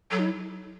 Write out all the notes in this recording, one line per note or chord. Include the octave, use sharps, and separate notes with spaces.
F#3 A4
D#4
E4